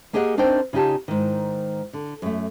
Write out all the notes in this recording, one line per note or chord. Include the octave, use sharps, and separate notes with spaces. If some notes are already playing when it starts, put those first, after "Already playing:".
A#3 G4 G#4 A#4 D#5 F#5
C4 D4 D#4 A#4 C5 G5
C#3 D#4 F4 G4 A5
G#2 D#3
D3
F#2 A3